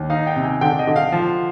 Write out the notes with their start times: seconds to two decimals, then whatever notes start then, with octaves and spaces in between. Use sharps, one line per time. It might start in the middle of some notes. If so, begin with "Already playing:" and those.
Already playing: D#2
0.10 D#4 F5
0.27 G5
0.36 C3
0.44 G#5
0.61 D3 G5
0.79 D#5
0.87 D3
0.96 F5
1.12 F3